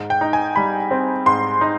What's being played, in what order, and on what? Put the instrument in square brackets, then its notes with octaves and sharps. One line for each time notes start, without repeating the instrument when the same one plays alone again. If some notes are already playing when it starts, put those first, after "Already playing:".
Already playing: [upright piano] G#2
G5
D#4
G#5
G3 B5
C4
G#2 C6
D#4